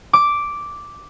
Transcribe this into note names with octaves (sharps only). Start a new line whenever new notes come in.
D6